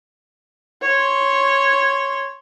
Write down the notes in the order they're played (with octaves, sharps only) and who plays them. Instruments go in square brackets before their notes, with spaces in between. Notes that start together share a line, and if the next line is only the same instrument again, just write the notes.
[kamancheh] C#5 C6